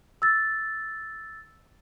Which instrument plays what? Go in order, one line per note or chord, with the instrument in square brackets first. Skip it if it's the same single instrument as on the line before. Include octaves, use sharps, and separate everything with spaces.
[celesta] E6 A6